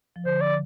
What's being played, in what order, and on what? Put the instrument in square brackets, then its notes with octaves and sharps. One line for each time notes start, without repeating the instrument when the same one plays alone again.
[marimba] F3
[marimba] D3 [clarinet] C5
[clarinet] D5